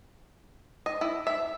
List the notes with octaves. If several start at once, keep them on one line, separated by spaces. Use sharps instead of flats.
D#5
E4
E5